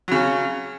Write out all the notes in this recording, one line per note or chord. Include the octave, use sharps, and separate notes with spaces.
C#3 F#3 C#4